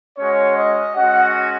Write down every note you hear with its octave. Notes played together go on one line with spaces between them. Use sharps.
G#3 C#4 F#4 C#5
D#5
G#3 C#4 F#4 F#5